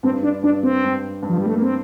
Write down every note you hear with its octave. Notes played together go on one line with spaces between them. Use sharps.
G2 C4
D4
G2 D4
C4
G2
G2
F3
G3
A3
A#3
C4